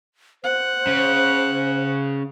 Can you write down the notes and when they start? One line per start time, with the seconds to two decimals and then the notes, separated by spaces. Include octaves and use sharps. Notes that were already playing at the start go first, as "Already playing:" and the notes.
0.44 C5 F#5
0.87 C#3